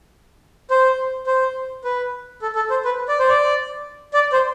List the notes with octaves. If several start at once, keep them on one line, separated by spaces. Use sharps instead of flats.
C5
C5
B4
A4
A4
C5
B4
D5
C5
D5
D5
C5